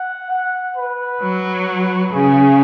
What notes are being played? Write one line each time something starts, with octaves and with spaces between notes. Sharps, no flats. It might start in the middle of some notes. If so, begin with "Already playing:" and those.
Already playing: F#5
F#5
B4
F#3
C#3 G#4